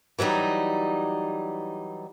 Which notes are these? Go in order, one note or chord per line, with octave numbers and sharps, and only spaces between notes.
E3 F#3 G3 D#4